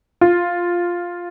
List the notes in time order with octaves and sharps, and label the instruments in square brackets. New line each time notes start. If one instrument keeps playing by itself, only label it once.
[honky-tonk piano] F4